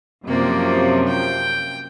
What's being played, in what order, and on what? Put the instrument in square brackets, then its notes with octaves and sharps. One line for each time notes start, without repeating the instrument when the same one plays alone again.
[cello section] F#2 C3 F3 [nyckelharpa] A#3 D5
[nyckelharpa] G5